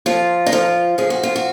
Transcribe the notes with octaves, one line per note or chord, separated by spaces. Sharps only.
F3 F4
D#4
F3 F4
F3 G#4
F#4
F4
F#4